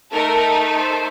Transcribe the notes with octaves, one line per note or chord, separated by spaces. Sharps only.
A3 D#4 A4 A#4
C5